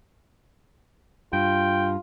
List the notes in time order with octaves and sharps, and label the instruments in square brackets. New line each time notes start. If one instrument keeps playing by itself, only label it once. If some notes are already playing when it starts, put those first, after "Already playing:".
[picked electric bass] G2 [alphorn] F4 [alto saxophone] G5